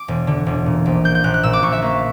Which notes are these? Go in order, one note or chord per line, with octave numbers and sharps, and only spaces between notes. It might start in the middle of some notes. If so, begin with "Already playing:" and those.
Already playing: D6
E1
D3
E1
A#2
A#1
A#3 G6
G6
A#1 F#6
F#6
A#2 E6
D6
A#1 C#6
E5
A#3